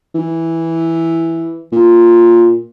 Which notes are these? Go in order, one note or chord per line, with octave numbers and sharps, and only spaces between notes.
E3
A#2